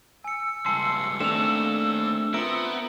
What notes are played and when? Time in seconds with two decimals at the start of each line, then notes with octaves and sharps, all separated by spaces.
0.24 G#5 E6 C#7
0.66 C#2 G2 G#5 A5 C6 C#7
1.20 D#2 D#3 A3 C4 D4 E7 F7
2.34 B3 C4 F4 A#4 E5 D7